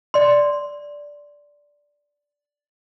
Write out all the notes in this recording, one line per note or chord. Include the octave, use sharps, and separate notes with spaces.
D5 C6